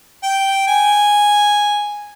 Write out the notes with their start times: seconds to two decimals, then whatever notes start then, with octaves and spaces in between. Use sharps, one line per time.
0.23 G5
0.67 G#5